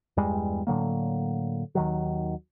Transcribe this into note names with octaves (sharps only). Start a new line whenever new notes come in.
E2 G2 G3 G#3
A2 D3 F#3 A#3
D#2 D#3 F#3